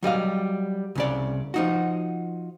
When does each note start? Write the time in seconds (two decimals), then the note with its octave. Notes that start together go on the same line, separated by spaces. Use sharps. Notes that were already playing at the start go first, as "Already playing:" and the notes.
0.03 F#3 G3 D#5 F5
0.95 C2 C#3 D5
1.54 F3 D#4 F#4